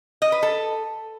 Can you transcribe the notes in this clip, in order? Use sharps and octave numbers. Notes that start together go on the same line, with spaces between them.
D#5
B4
A4